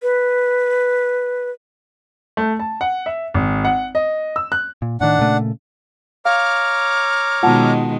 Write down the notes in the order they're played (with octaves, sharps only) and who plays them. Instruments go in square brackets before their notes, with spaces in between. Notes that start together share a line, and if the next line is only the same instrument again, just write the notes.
[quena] B4
[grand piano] A3
A5
F#5
E5
G#1
F#5
D#5
E6
F#6
[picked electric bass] A#2
[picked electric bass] A2 D#3 [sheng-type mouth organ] D4 F#5
[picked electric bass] A#2 C#3 A3
[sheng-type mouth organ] C#5 A#5 D6 [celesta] F5 [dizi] F6
[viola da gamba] B2 D#3 G#3 [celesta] F4 F#5 A5